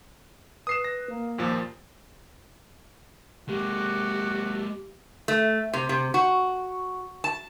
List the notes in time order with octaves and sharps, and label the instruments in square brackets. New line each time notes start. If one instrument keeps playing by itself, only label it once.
[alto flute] B4 [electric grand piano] D#6 C7 E7
[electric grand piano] A#6
[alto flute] A#3
[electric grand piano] D#2 A#2 F3
[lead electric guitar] G#3 A#3 [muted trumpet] F#4 [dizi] G4
[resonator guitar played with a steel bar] A3
C3
C3
F#4
A5